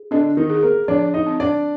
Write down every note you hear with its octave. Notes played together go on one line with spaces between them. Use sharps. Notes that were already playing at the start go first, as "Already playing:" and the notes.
Already playing: G#4
D3 D4 D#5
D#3 D#4
G#4
A#3 A#4
F3 D4 D5
D#4 D#5
C4
D4 D5